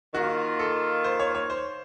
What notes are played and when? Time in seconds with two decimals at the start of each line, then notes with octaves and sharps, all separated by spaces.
0.14 D#3 A#3 F4 F#4
0.59 A4
1.04 C5
1.19 C#5
1.35 C#5
1.50 C5